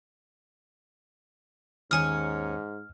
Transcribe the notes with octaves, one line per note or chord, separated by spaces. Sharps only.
D#2 G#2 C#4 C#5 G#5 D#6 F6